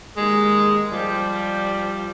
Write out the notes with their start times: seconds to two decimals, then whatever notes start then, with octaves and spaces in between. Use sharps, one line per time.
0.17 D#2 G#3
0.91 F3 G3